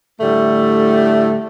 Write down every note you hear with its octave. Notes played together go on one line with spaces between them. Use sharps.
A2 D3 G3 A3